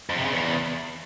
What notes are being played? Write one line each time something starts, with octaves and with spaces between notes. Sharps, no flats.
F2
C3
C#3
E2